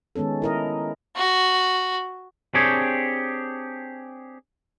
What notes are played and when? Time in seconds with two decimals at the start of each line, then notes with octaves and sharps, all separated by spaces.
0.16 D#3 G#3 B3 C#4 A4
0.42 E4 A#4 D#5
1.16 F#4
2.54 C4 D4 G4 G#4 C#5